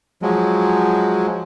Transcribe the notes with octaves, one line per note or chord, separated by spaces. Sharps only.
F3 F#3 G#3